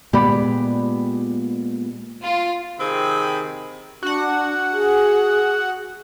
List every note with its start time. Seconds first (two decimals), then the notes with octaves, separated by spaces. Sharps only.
0.13 A#2 G#3 B3 G4 D5 B5
2.21 F4
2.79 C3 D#3 C4 G#4 B5
4.03 D4 F#4 F#5
4.72 G#4